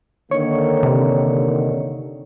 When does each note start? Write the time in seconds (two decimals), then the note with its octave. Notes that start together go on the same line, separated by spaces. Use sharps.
0.31 D3 D#3 A#3 C#5
0.83 C3